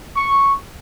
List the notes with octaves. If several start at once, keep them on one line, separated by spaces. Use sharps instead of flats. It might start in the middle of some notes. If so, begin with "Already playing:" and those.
C#6